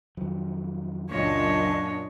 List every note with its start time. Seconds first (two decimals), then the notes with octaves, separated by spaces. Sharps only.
0.17 F2 D#3 F#3
1.10 C#2 F#2 A#2 D4 C#5 D#5